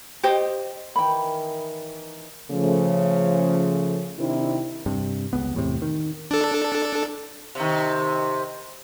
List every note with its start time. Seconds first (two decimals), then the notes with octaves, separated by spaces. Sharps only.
0.23 G4 C5 D#5 G5
0.96 D#3 E3 G5 B5
2.51 C#3 F3 A3
4.19 C3 D#3 C4 D4 E4
4.86 G2 C3
5.33 C#2 B3
5.54 E2 A2 C3
5.82 D#3
6.31 D4 A4
7.55 C3 D#3